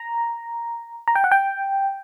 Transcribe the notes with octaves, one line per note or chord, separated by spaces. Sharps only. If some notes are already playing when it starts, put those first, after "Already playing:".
Already playing: A#5
A#5
G5
F#5
G5